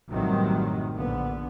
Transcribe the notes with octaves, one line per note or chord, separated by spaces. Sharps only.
A1 F#2 C3 D#3 F#3 G3
A#1 D3 B3